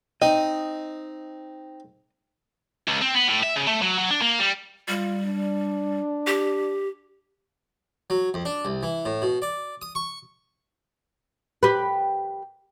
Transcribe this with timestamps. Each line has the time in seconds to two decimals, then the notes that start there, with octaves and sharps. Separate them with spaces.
0.22 C4 D#4 D#5
2.88 C#2
3.02 C4
3.14 B3
3.28 A2
3.43 E5
3.56 C#3
3.67 A3
3.82 F#3
3.99 F#3
4.11 D4
4.22 A#3
4.40 G3
4.88 G3 F4
5.25 D4
6.27 G4
8.10 F#3
8.34 F2
8.45 D4
8.65 C2
8.83 E3
9.05 A2
9.22 B2
9.42 D5
9.82 D#6
9.95 C#6
11.63 G4 B4